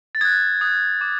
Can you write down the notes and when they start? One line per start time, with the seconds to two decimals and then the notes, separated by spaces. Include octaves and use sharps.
0.15 A6
0.21 D#6 F#6 G#6
0.61 D#6 F#6
1.01 D6